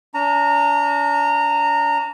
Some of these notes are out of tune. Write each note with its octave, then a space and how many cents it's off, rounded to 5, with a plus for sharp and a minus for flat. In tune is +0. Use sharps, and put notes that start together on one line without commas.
D4 -45 A#5 -20